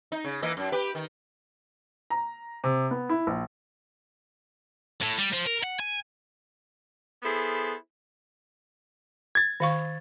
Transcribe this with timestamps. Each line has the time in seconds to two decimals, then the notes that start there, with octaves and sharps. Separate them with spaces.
0.12 D#4
0.24 C#3
0.42 E3 A#3 D#5
0.57 F#2
0.72 G4 B4
0.95 D#3
2.10 A#5
2.64 C3
2.91 B3
3.09 E4
3.27 A#1
5.01 A2
5.18 G3
5.32 F3
5.46 A#4
5.63 F#5
5.79 G#5
7.23 B3 E4 G#4 A4 C5
9.35 G#6 A6
9.60 D#3 F5 C#6